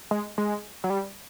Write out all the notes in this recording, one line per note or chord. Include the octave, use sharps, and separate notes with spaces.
G#3
G#3
F#3
G3